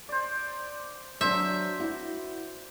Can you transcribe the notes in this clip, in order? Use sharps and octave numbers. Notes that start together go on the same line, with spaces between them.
C5 D5
F#3 D4 C5 E5
E4 F#4